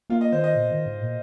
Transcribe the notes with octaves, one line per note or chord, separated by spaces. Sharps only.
A#3 F4
D#5
D#3 C5
D#5
A#2
D#3
G#2
A#2